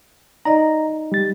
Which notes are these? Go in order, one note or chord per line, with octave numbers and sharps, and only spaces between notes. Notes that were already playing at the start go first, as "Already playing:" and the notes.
D#4 D5 D#5 A#5
G3 A6